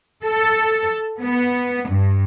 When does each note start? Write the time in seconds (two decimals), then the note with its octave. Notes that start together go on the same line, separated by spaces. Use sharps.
0.23 A4
1.21 B3
1.91 G2